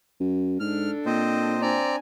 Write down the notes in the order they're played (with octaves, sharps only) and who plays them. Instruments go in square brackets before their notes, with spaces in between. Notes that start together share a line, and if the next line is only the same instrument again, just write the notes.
[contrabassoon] F#2
[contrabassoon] G#2 [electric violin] D4 A4 [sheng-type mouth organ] F6
[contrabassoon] A#2 [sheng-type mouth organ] C4 C5 D#5
[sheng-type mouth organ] C4 D5 A#5 [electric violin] D4 G#5